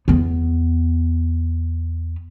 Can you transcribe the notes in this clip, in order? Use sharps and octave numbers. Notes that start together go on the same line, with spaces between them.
E2 B3